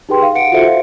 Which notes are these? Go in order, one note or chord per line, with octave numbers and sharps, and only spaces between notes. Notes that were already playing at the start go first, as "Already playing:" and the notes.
D#4 G4 G#4 B4 G5 C6
F5
F#5 C#7 D7
F4 F#4 A4 C5 E5 C#7
E5 F5